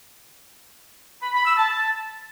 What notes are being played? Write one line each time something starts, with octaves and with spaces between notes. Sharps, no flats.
B5
B5
E6
A5